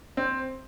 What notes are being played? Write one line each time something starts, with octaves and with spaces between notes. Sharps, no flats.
C4